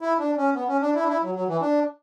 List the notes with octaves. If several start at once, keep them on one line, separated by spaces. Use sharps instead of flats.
E4
D4
C#4
B3
C#4
D4
E4
D4
E4
F#3
F#3
E3
D4